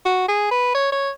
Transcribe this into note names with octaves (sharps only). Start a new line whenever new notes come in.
F#4
G#4
B4
C#5
C#5